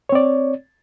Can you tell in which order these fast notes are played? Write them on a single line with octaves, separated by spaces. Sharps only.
C#5 C4 D5